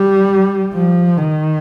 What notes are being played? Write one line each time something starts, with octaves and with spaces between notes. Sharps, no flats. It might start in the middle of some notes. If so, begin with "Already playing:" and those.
Already playing: G3
F3
D#3